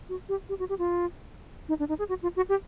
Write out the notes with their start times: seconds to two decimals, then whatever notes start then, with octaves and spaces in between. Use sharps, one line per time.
0.09 F#4
0.29 G4
0.49 G4
0.59 F#4
0.69 G4
0.79 F4
1.69 D#4
1.79 D4
1.89 D#4
1.99 G#4
2.09 F#4
2.23 F4
2.36 F#4
2.49 G4